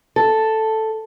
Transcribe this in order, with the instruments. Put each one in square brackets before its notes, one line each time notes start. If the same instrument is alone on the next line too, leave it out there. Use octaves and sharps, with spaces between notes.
[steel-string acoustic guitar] A4